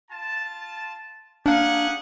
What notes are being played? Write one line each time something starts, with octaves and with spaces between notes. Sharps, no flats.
F4 A5
A#3 D4 G4 G#4 F5 F#5